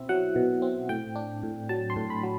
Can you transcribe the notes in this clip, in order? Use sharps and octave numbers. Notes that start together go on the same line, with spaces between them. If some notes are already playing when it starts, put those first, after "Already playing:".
Already playing: B2 C4 E4 E5
F#3 F#5
B2
C4
A2 G5
D4
A2
F#3 A5
C6
A2
B5
F#3